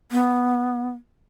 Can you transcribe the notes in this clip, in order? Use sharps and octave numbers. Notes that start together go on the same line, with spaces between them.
B3